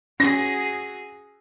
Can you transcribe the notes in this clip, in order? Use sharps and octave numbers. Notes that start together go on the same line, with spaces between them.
C#4 F#4 G#4 A#6